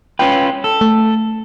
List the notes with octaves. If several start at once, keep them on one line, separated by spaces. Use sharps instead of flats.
C#4 F4 B4 G5
A4
A3